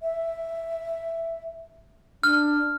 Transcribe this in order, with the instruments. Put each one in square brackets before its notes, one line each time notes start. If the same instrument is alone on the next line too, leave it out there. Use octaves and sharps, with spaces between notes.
[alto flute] E5
[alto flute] D4 [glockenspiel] F6